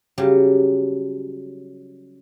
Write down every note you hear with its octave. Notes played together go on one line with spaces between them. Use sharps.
C#3 F#3 G3 G4